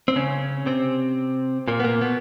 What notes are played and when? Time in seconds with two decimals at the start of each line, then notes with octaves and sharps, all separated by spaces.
0.08 C4
0.16 C#3 C#4
0.66 C3 C4
1.68 A#2 A#3
1.80 B3
1.84 A#2 A#3
2.01 B2 B3